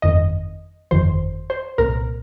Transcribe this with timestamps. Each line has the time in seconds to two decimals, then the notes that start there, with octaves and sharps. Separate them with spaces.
0.02 G1 F2 D#3 D#5
0.91 G1 F2 D#3 C5
1.50 C5
1.78 C2 A#2 A#4